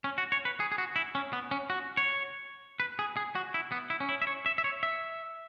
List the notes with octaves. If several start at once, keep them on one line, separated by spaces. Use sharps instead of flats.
C#4
F#4
C#5
B4
G#4
G#4
F#4
E4
C#4
B3
C#4
F#4
C#5
B4
G#4
G#4
F#4
E4
B3
E4
C#4
E4
E5
C#5
E5
E5
C#5
E5